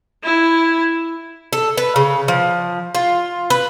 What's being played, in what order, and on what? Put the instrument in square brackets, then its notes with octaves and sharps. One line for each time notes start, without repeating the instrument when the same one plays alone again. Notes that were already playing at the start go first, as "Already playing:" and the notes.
[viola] E4
[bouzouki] A4
B4
C#3
F3
F4
B4